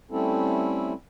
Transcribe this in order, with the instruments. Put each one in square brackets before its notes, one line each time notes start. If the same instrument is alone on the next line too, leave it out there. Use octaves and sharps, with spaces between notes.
[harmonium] G3 A3 C4 C#4 E4 A4